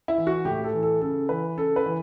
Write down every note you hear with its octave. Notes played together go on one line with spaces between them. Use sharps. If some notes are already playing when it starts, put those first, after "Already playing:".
E4
E3
F#4
A2 G4
A4
E3
A4
C#3 A4
E3 B4
C#3 A4
B4
E3